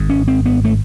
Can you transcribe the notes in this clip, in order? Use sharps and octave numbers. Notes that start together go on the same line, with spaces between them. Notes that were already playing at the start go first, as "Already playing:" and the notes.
Already playing: G#1 G#2
C#4
C4
B3
A3